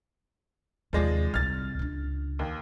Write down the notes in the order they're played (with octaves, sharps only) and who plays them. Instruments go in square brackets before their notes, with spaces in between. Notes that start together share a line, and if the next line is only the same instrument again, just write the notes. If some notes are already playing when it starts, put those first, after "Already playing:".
[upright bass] D#2 C3 [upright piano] F3 G#3 D5
[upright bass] C2 C3 [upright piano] F6 A6
[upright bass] C#2 D4
[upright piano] D#2